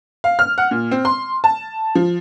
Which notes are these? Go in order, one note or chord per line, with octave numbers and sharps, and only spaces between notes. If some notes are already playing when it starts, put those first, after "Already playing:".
F5
F6
F#5
A#2
C4
C6
A5
F3